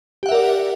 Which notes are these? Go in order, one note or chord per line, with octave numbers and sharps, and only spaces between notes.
G4 A#4 D5 E5 F#5